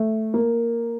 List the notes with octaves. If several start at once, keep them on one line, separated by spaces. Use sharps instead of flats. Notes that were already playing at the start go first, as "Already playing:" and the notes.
Already playing: A3
A#3